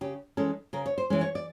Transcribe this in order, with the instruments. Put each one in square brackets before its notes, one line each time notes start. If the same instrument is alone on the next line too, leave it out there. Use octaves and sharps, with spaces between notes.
[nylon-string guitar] C#3 G4
E3 G#3 C#4 A4
C#3 A#4
C#5
C5
E3 G#3 C#4
C#5
D5